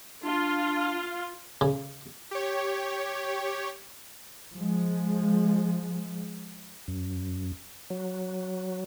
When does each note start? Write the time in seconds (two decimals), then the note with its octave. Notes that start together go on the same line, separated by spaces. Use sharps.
0.24 D4 F4
1.61 C#3
2.31 G4 C#5
4.55 F3 G#3
6.88 F#2
7.90 F#3